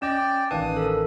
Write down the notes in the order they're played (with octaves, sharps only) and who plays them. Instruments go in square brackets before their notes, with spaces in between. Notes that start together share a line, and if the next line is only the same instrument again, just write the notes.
[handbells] C#4 D#5 [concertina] D5 G5 [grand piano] E7
[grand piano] A1 D#3 F5 [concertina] D4 D#6 [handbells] B4 G#5
[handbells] A4 A#4